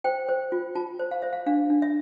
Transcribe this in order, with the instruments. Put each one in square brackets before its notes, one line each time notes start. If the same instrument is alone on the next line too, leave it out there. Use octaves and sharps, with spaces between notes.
[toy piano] C5 G5
C5
F4
F4 A5
C5
F5
C5 E5
F5
D4 F5
D4
E5